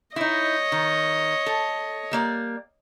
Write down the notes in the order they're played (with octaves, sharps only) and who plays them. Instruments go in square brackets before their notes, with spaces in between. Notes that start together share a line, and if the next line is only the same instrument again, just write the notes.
[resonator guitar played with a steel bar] D#4 E4 [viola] C#5 D#5
[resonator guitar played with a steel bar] D#3
A4
G3 A#3 D5